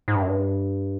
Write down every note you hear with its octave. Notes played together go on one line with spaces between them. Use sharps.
G#2
G2
F#2
G2